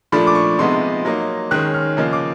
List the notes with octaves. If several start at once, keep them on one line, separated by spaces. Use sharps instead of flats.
A#2 F3 A3 D4 B5
D6
C#6
C3 F3 G#3 B3 D#4 C6
F#3 A#3 D#4
D#3 G#3 C#4 F#6
F6
C#3 F3 A#3 D#4
D6